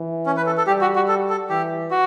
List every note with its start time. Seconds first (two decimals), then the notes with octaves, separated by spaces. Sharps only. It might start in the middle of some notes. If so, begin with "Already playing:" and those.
Already playing: E3
0.26 C#4
0.37 B4
0.46 A4
0.58 A4
0.67 G3 G4
0.81 F#4
0.96 F#4
1.08 A4
1.30 A4
1.50 E3 G4
1.91 F#4